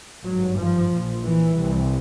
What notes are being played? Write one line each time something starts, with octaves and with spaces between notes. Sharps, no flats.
G#1 G2 F#3
F3
A#1 A#2
E3
C2 C3